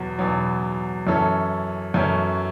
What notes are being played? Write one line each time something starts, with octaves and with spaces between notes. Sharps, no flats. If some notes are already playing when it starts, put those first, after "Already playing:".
Already playing: E2 B2 F#3
E2 B2 F#3
F#2 E3 C#4 A4
F#2 E3 C#4 A4